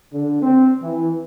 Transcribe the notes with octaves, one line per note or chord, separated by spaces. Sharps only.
D3
C4
E3